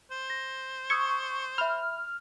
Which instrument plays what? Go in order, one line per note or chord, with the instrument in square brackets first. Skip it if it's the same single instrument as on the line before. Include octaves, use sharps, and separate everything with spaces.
[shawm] C5
[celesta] A#6
[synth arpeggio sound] C#6 [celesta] D#6 E6 G#6
[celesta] E5 B5 [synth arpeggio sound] F6